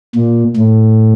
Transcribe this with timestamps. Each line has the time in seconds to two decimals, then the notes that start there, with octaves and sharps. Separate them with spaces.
0.16 A#2
0.56 A2